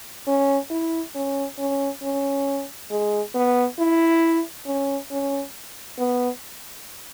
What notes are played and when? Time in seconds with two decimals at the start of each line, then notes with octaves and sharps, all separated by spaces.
0.27 C#4
0.71 E4
1.14 C#4
1.58 C#4
2.02 C#4
2.90 G#3
3.35 B3
3.79 E4
4.66 C#4
5.11 C#4
5.98 B3